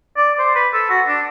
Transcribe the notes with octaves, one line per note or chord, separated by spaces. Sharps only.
D5
C5
B4
A4
F#4
D4